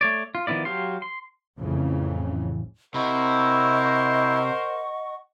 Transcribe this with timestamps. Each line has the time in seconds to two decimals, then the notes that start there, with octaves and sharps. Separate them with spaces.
0.01 A3 C#5 D5
0.35 F4
0.47 D#3 F3 B3 E4 D5
0.65 F#3 G4 F5 C6
1.02 C6
1.58 A1 F2 C#3 E3
2.94 C3 E4 A#4 C5 D#5 F#5 C#6